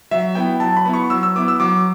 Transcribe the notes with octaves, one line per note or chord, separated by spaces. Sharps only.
F#3 E5
B3 E4 G5
F#3 A5
B5
B3 E4
C#6
F#3 E6
E6
B3 E4 D6
E6
F#3 D6